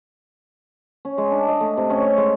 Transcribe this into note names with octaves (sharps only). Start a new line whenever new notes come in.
C#4
G#3
D4
D#5
A3
C3
C#4
C#5
G#3